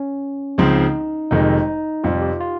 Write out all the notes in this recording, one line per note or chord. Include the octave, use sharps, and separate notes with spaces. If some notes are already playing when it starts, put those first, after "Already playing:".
Already playing: C#4
C#2 C#3 F3 C4 D#4
F1 F2 D#3 G#3 D#4
F2 C3 G3 F4
G4
F4